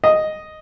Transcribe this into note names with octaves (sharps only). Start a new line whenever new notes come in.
D#5